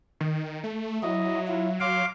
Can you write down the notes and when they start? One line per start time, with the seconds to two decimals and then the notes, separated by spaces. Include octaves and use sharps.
0.21 D#3
0.64 A3
1.03 F#3 E4 D#5
1.48 E4 F4
1.80 F#3 F5 C6 D6